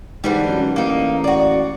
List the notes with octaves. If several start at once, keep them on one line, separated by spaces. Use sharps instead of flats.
G#2 D3 E3 G3
F#2
A1 A#3 D#4
F#4 D5